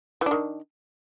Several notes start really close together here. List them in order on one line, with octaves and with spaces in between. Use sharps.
E3 D4 D#3